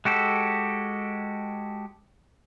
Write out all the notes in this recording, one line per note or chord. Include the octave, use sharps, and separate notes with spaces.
G#3 F#4 G4 A4